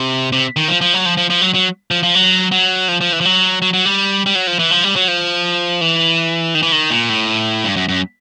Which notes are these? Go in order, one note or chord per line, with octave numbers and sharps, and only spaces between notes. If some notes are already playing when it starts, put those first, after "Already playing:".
Already playing: C3
C3
D#3
F3
F3
F#3
F3
F3
F3
F#3
F#3
F3
F3
F#3
F#3
F3
F3
E3
F3
F#3
F#3
F#3
G3
G3
F#3
F3
E3
F3
G3
F#3
F3
E3
D#3
E3
D#3
A#2
A2
G2
F#2
F#2